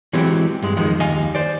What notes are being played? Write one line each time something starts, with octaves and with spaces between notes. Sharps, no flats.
E3 F#3 G#3 C4 G4
G2 G#3
F2 D#3 F3 G#3
D#2 D#5 F5 G#5
C5 D5